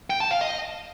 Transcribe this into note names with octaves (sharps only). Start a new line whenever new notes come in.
G5
A5
F5
D#5